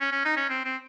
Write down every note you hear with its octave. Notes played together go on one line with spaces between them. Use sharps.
C#4
C#4
D#4
C#4
C4
C4